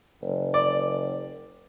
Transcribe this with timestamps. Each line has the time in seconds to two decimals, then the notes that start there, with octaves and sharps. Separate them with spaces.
0.22 F#1
0.54 D5